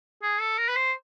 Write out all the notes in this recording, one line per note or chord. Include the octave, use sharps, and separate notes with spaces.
G#4
A4
A#4
B4
C5